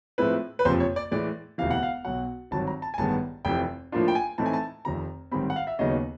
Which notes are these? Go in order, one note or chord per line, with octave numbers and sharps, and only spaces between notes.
A2 F3 G#3 C4 E4 B4
B4
F#1 F2 C3 F3 C5
C#5
D5
A2 E3 G#3 D5
E1 D2 C3 E3 F5
F#5
F5
B1 B2 F#3 F#5
G#1 G2 D#3 F#3 A5
A#5
A5
G#5
A1 G2 D#3 G#3 B3 A5
F1 F2 C3 E3 G5
A2 F3 A#3 D4 F4
G5
G#5
A2 E3 A3 C4 D#4 A5
G#5
A5
F1 F2 C3 D#3 A#5
A1 G#2 D#3 G3 C4 B5
F#5
F5
E5
D#2 C#3 F#3 B3 D#4 D#5